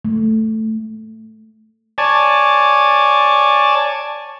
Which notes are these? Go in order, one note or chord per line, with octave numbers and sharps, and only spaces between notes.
A3
C#5 D5 G#5 A5